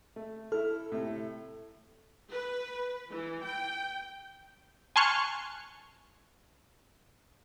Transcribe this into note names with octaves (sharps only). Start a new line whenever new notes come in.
A3
E4 A4 F6
A2 C3
B4
E3
G5
G#5 A5 C6 C#6 F6 F#6